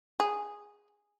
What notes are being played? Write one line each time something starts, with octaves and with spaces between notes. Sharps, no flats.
G#4